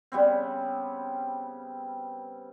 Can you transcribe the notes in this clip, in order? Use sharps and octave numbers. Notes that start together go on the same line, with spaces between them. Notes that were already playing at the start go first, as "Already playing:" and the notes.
C#3 G3 B3 C4